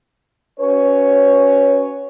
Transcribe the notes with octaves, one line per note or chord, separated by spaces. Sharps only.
C#4 F#4 B4 C#5